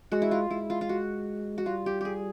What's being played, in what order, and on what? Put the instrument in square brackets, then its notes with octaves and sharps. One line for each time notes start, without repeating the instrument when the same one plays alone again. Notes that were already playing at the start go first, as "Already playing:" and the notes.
[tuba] G#3 [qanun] F#4
[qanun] E4
F4
[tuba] G#3 [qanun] E4
[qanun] F4
F4
F#4
F#4
[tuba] G3 [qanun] F4
[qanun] G4
G4 G#4